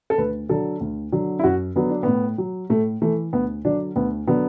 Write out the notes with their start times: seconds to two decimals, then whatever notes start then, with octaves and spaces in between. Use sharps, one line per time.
0.10 A4
0.18 D2 B4
0.49 D3 F#3 A4
0.81 D2
1.12 D3 F#3
1.39 E4
1.44 F#2 F#4
1.75 D3 F#3 B3
1.89 D4
2.03 A2 B3
2.38 F#3
2.70 A2 A3
3.02 E3 A3
3.33 D2 B3
3.65 D3 F#3 D4
3.96 D2 B3
4.27 D3 F#3 B3